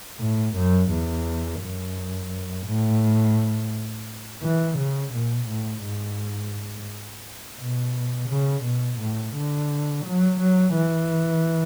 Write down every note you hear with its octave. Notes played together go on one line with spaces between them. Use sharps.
A2
F#2
E2
F#2
A2
E3
C#3
B2
A2
G#2
B2
C#3
B2
A2
D3
F#3
F#3
E3